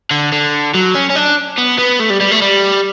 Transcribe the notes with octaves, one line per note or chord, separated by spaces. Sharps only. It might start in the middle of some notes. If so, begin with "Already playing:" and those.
D3
D3
F#3
C#4
C#4
D4
B3
B3
A3
G3
G3
A3
G3